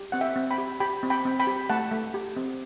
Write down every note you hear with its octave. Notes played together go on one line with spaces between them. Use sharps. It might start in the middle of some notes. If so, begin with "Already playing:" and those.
Already playing: G4
C4 F#5
E5 G5
C4
G5 B5
G4
G4 G5 B5
C4
G5 B5
C4
G5 B5
G4
A3 F#5 A5
A3
G4
C4